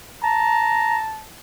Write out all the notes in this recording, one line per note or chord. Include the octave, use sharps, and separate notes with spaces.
A5 A#5